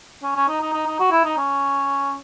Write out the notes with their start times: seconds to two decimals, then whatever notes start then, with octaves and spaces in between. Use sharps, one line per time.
0.23 C#4
0.36 C#4
0.48 D#4
0.61 D#4
0.73 D#4
0.87 D#4
1.00 F#4
1.11 E4
1.25 D#4
1.37 C#4